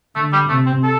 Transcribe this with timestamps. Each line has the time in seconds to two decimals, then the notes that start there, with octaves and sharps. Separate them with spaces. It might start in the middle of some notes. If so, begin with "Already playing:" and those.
0.16 D3 A3
0.33 G3
0.49 C3 A3
0.66 C4
0.83 A4